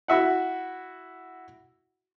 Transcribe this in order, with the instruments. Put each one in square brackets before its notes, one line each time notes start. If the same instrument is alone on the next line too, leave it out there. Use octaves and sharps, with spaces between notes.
[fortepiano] E4 F#4 E5 F#5